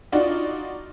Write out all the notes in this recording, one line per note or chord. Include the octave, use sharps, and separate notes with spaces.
D4 D#4 F4 F#4 D5